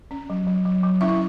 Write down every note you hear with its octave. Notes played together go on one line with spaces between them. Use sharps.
C#4
F#3
F#3
F#3
F#3
C#4 E4 E5